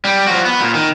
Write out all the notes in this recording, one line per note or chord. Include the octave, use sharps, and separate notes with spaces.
G3
F3 F#4
B3
A#2
D#3